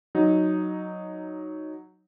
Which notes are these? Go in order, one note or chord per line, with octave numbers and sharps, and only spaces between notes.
F#3 D#4